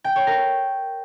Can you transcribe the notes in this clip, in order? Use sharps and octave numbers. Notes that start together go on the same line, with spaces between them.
G5
C#5
A#4